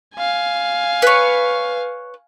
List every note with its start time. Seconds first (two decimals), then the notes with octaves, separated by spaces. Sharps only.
0.15 F5 G#5
1.02 B4 C#5